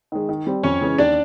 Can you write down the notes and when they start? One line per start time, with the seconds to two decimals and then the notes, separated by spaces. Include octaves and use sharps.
0.12 D#3 G#3
0.29 D#3
0.47 G3 C4
0.63 F2 C#4 C#5
0.81 C#3 E3 G#3 C#4
0.98 D#2 D4 D5